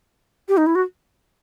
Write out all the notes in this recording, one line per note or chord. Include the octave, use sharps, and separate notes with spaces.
G4
D#4
E4
F#4